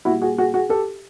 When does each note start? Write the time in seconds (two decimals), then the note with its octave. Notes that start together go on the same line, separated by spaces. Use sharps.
0.05 A#2 G3 E4 F#4
0.21 F#4 G#4
0.38 F#4 G#4
0.54 F#4 G#4
0.69 G4 A4